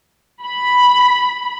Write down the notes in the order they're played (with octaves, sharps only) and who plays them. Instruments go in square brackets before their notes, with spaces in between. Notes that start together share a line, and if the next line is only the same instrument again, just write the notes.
[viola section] B5